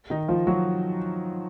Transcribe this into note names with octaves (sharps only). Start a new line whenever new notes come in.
D#3 D#4
F3 F4
F#3 F#4